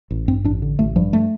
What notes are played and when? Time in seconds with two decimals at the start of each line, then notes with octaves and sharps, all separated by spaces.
0.11 A1
0.28 G2 C4
0.44 A1 D4
0.62 D3
0.79 A1 A3
0.96 G2 F3
1.13 A3